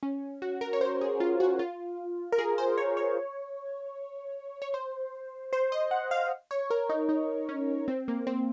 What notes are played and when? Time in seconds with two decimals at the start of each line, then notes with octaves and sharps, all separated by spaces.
0.03 C#4
0.42 F#4
0.61 A#4
0.73 C#5
0.81 C5
1.01 G#4
1.20 F4
1.40 F#4
1.59 F4
2.32 A#4
2.38 G#4
2.58 C5
2.78 C#5
2.97 C#5
4.62 C#5
4.74 C5
5.53 C5
5.72 D#5
5.91 F#5
6.11 F5
6.51 C#5
6.70 A#4
6.89 D#4
7.09 D#4
7.49 C#4
7.88 C4
8.08 A#3
8.27 C4